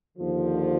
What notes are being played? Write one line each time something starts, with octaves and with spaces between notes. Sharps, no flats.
D#2 D3 F3